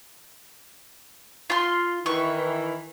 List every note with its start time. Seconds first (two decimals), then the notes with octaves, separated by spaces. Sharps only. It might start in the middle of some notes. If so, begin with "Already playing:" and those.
1.50 F4 C6
2.06 D#3 E3 C#6